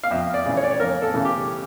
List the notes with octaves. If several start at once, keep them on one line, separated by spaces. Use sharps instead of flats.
F5
F2 E5
D5
C#3 E3
C#5
D5
C#5
F2 A#4
A4
C#3 E3
G4